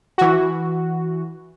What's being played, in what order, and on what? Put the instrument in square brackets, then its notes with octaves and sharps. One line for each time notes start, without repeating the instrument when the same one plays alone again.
[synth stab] E3 F#4